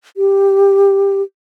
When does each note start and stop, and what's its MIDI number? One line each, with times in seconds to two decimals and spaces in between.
0.17 1.22 67